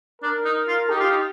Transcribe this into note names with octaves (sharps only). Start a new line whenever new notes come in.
D4 A#4
D#4
F4
D#4 G4
F4
D#4